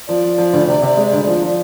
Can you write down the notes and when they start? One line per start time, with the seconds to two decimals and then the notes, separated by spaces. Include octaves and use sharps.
0.08 F3 D5
0.24 F3
0.38 F3
0.53 D2
0.68 C3
0.83 C3
0.97 G#3
1.13 D2
1.27 F3
1.42 F3